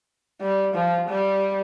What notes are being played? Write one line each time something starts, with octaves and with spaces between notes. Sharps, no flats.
G3
F3
G3